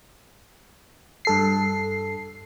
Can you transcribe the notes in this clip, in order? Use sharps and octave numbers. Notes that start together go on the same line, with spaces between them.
G2 A4 C7